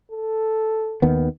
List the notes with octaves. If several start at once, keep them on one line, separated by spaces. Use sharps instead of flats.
A4
D#2 D#3 B3